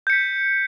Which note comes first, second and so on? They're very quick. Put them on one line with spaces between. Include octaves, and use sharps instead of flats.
G6 C#7 B6